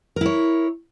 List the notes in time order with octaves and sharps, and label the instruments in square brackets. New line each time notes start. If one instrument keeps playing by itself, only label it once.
[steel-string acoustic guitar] A#4
E4
C#5